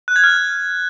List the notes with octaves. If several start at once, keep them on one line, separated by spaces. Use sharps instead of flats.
F#6
G#6
F6